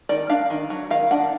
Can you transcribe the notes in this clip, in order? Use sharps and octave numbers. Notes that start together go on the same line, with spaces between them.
D#3 D5
D4 F5
D#3
F#3
D#3 F5
D4 F#5